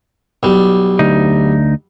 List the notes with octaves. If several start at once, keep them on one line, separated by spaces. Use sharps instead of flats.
B1 G3
D2 D#4